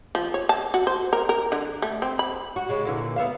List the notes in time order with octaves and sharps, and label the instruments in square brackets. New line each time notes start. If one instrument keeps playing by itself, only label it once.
[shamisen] F3
C#5
A5
F#4
C5
A#4
A#4
D3
A3
C4
B5
[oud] F#4
C#3 G#3
A#2 D3 E3
B3 E5 F5